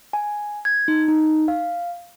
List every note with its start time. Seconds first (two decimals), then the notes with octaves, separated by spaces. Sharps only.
0.13 G#5
0.65 G#6
0.88 D#4
1.08 D#4
1.48 F5